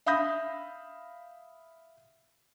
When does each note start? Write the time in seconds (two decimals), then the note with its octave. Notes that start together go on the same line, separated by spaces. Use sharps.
0.06 E5 F5 B5 D#6 G6 A#6